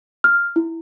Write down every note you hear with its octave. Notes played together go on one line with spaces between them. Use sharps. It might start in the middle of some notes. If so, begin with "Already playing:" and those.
F6
E4